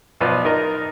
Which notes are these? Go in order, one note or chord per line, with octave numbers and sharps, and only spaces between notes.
B1 B2 F3 B3 D5
D#4 A#4 D#5 A#5